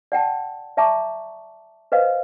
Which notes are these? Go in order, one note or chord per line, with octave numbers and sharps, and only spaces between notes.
D5 F#5 G5 A5
D5 E5 A5 A#5 C#6 D6
B4 C5 D#5 F5